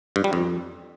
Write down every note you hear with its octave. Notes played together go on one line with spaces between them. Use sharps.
G2
G3
F2